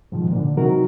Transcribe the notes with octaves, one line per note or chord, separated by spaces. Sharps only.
G#2 B2 D#3 F3
A#2 D3
C3 E3 F#3 D#4 F#4 A#4